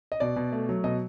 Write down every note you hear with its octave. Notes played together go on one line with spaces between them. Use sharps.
D#5
B2 D5
B2
A3
F#3
B2 D#5